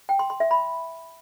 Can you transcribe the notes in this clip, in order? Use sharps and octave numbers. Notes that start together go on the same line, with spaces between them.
G5
C6
C6
E5
B5